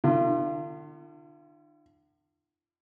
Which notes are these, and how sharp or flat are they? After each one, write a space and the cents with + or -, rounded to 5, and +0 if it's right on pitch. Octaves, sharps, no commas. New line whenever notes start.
D3 +40 F4 -40